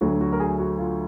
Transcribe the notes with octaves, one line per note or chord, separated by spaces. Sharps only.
D2 D3 F#3 F#4
F#4
A#4
G#4
F#4
F4